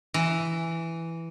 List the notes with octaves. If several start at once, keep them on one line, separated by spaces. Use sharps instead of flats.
E3